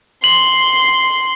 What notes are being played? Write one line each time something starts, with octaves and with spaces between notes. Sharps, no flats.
C6 F#7